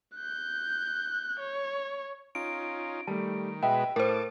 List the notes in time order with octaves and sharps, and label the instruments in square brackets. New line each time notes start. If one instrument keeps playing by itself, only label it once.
[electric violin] F#6 G6
C#5
[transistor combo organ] C#4 D#4 F4 [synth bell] D7
[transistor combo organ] D#3 [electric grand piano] G3 A3 [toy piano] A5
[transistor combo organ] B2 G#3 B4 [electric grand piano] D#5 E5 [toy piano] G5
[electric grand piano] A2 [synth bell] A#4 C5 [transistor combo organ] A5 D6